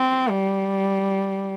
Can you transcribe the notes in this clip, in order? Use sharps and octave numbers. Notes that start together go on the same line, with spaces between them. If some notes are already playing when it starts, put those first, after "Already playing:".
Already playing: C4
G3